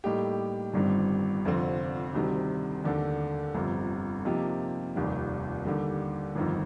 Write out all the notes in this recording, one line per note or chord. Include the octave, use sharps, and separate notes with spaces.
A2 G3 A#3 D#4 G4
G1 G2 D#3 G3 C4
F1 F2 D3 F3 C4
D2 C3 D#3 G3 C4
D#2 D3 A3 D4 A4
G1 F2 C3
C3 F3 A#3 D#4 G4
F1 D#2 D#3 G3
D#2 D3 G3
G1 F2 D#3